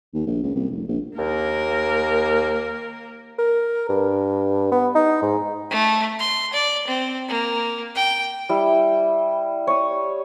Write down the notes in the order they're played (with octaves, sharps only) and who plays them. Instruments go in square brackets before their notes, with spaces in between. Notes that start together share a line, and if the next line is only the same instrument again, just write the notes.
[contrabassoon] D#2
A#1
C#2
C2
F1
A#1
[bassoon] D#2 [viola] A#3 A#4
[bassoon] A#4
G2
B3
D#4
G#2
[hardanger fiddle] A3
C6
D5
C4
A#3
G5
[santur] G3 E4
C#5 D#6